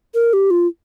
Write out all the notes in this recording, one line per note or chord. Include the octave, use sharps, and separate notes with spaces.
A#4
G4
F4